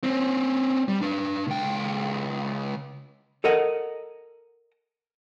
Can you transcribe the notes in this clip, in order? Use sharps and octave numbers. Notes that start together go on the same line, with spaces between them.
C4 C#4
G3
D4 B4
C#2 G5
A4 A#4 D#5 F#5